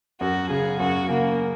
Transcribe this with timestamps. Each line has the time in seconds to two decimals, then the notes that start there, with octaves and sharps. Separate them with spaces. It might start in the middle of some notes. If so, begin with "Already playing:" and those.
0.20 F#2 F#4
0.50 C#3 G#4
0.80 F#2 F#4
1.09 C#3 A#3